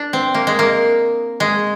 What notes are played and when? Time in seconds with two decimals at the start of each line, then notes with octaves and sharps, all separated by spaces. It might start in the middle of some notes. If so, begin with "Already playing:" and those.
Already playing: D4
0.13 C4
0.34 A#3
0.47 G#3
0.59 A#3
1.40 G#3